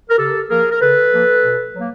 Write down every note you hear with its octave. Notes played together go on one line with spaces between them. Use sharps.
A#4
C#3 G4 A4
F3 A#3 G#4 A#4
A#4
C#3 A4 B4
F3 A#3
B2
F#3 A#3